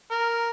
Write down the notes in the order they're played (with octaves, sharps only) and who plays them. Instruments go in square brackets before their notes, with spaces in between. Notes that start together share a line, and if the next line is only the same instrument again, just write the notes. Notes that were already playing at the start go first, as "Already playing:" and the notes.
[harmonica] A#4